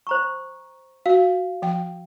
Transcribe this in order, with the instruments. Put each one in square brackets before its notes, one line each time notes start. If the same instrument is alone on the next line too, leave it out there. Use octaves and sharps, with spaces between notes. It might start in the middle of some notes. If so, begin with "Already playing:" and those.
[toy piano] C5 A#5 C#6
[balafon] F#4 [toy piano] F5
[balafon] F3 G5